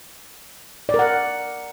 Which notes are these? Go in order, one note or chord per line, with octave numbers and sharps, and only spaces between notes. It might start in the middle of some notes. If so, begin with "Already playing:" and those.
D5
A#4
F#5